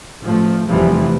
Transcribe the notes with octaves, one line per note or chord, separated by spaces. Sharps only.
A1 F3 A3
F1 E2 C3 E3 F3 G3